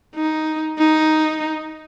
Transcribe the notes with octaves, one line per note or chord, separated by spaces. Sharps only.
D#4
D#4